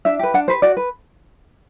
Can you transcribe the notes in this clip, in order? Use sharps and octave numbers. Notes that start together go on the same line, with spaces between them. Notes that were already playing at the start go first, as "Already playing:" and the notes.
D4 E5
G4 B4
D4 F#5
G4 B4 C5
F#4 D5
B4